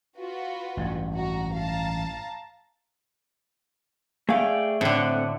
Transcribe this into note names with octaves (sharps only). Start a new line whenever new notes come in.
F4 F#4 B4
A1 G2
F#4 A#5
F5 A5 A#5
A3 G#4 D5 F5 G5
A2 D3 C4 F#5